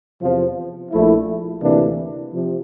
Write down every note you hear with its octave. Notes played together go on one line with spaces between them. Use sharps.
E2 C3 F3
A#1 A#2 F3 A3 E4
D2 C3 E3 A#3 D4
C3 F3